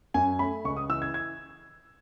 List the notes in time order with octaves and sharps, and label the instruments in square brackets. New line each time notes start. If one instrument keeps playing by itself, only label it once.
[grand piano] F#2 G#5
A3 B5
C#2 C#6
D#6
E3 E6
G#6
G#6